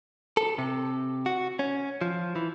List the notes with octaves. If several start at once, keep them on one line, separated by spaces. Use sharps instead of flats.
A4
C3
F#4
C#4
F3
E3